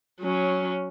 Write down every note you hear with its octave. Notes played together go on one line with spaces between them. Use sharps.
F#3 C#4